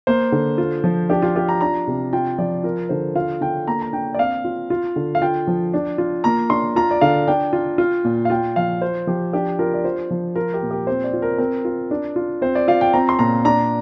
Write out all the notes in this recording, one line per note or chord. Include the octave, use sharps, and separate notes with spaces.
A#3 C5
D3
F4
F3
D4 G4
F4
F4 G4
A#5
D4 A#5
C3
F4 G5
F3 D5
F4 A#4
D3 C5
F4 F5
D3 G5
A#3 A#5
A#5
D4 G5
D5
C4 F5
F4
F4
D3
F5
F4 G5
F3
D4
F4
A#3 A#5
D4 C6
F4 A#5
D5
D3 F5
D4 G5
F4
F4
A#2
F5
F4 G5
F3 F5
F4 C5
F3 G4
D4 G4
F4 A#4
D5
F4 C5
F3
F4 A#4
G4
A#2
G4
C4 C5
D5
F4
A#4
C4 A#4
F4
D4
F4
C4 C5
D5
F4 F5
G5
C4 A#5
C6
A#2 A#5
D4 A#5